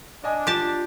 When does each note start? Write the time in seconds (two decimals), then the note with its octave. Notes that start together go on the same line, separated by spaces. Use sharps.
0.24 D4 D5 D#5 G#5
0.47 F4 G4 A5 D6